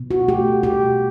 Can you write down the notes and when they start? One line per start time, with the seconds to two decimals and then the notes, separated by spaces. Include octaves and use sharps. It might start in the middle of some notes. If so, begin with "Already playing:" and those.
Already playing: B2
0.11 F#4
0.28 A3 G4
0.63 B2 G4